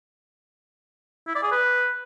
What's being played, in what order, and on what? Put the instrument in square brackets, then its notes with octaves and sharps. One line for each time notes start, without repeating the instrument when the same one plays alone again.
[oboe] E4
D5
G#4
B4